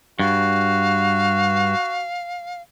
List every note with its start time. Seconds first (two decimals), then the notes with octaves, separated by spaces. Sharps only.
0.19 G2 F#4 F5